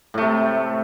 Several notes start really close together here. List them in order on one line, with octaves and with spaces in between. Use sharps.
A2 A3 C3